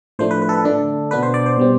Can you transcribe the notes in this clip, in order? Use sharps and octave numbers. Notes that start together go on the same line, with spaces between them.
A2 F3 A3 D4 C5
B4
B4
A4
B4
D3 A3 D4 A4
B2 B3 D4 B4
C5
D5
C5
B2 G3 C4